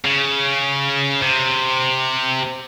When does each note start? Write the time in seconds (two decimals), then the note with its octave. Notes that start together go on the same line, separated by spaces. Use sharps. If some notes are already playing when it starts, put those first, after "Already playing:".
0.05 C#3
1.22 C3